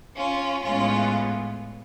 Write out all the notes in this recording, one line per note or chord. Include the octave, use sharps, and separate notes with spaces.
C#4 F4
A2 G#3 B3 C#4 F4